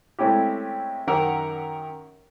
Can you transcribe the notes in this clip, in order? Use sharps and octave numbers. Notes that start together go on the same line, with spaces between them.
G#3 A3 C4 C#4 E4 G4
F#2 D#3 G4 A#4 F#5 E6